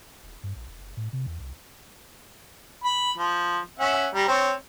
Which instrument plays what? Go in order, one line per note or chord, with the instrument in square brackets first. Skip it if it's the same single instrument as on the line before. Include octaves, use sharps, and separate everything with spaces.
[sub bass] D#1
G2
A#1
E1
F#1
A2
C3
E2
C2
[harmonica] B5
F3
C#4 E5 F#5
G3 A#5
C4 C#5